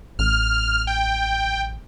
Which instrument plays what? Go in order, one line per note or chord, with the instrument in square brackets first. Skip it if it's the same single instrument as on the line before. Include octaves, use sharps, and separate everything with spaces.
[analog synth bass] A1 [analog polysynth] F6
[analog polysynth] G5